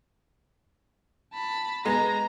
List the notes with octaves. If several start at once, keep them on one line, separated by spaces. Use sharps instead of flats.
A5 B5
G#3 B3 A#5